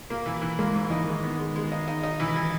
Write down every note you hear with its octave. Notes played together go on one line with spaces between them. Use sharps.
A#3
E3
E3
G#3 A#3
G#2
E3 D#4
D#3 G#3
B3
G#3
G#3
D#4
D#4
D#4
E3
E3